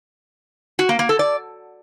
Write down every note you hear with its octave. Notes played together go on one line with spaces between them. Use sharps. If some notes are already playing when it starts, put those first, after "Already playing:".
F#4
A#3
A#3
A4
D5